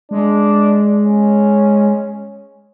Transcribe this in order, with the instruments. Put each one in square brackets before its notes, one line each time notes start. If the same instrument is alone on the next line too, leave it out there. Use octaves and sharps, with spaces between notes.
[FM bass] G#3 [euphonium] D4
[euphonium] C#4